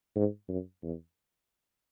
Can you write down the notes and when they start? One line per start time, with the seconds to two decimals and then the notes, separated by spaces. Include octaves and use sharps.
0.16 G#2
0.49 F#2
0.83 E2